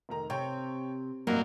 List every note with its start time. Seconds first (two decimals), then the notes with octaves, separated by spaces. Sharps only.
0.09 F1 D#3 A#5
0.30 C3 C#5 G5
1.27 A1 G2 C3 F#3 A#3